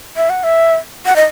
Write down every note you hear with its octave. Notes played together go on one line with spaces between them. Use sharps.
E5
F#5
E5
F#5
D#5